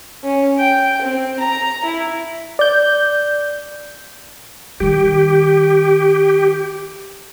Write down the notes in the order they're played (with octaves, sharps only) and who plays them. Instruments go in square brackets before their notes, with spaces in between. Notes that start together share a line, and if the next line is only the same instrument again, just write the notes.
[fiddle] C#4
G5
C4
A#5
E4
[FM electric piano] D5 G6
[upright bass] D#3 G3 [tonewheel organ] G4